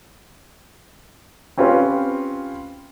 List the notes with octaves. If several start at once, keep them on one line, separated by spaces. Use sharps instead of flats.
C4 C#4 F4 G4 B4